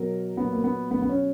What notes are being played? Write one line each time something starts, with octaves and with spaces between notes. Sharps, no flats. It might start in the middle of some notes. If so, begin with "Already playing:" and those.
Already playing: B2 F#3 A#4
A#2 F#3 B3
A#3
B3
B2 F#3 B3
B3
C#4